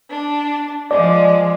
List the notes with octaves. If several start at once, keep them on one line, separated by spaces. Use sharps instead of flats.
D4
F3 G#3 D5